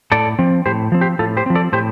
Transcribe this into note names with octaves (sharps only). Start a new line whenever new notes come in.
A2 A4 D5
F3 C4
A2 G4 C5
F3 C4
G4 C5
A2 F4 A4
G4 C5
F3 C4
A4 D5
A2 G4 C5